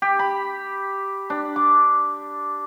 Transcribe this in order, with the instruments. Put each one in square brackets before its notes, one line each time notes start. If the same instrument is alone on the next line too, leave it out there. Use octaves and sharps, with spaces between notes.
[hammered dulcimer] G4
B5
D4
D6